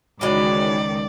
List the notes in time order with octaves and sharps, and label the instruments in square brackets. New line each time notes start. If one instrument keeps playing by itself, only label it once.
[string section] C#2 D#3 [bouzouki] E3 F#3 G#3 [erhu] D5